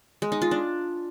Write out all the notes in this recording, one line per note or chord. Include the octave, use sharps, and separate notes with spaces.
G#3
D#4
F4
D4